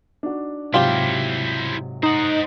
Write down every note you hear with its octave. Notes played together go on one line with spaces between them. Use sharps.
D4 D#4 F#4
G#2 C3 F#3 E4 F4 G4 C5
D#4 C5 F#5